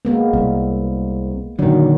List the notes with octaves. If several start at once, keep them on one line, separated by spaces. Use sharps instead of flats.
G#3 A#3 B3
C2
A#2 D3 D#3 F#3